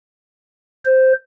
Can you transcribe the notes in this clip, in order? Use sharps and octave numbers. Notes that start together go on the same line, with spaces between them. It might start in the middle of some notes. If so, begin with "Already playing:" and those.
C5